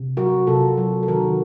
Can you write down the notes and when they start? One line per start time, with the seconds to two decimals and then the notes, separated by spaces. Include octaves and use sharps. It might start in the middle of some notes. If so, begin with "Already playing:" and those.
Already playing: C3
0.17 F#3 F#4 A#4
0.47 C3 F4 A4
0.78 F#3
1.03 A4
1.08 D#3 F#4 A#4